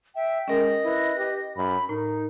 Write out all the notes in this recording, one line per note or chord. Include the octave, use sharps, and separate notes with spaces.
E5 G5
G#3 C#4 A#4 D#5
E4 B4
G4
F#2 B5
A2 D#4 A#4